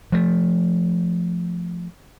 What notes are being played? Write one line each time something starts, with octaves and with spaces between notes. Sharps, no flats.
F3 A3